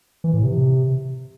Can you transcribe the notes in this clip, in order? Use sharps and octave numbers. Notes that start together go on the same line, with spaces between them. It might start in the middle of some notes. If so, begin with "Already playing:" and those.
E3
A2
C3